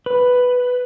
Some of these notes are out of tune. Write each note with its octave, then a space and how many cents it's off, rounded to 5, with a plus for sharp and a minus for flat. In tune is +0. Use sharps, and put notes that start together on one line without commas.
B4 +5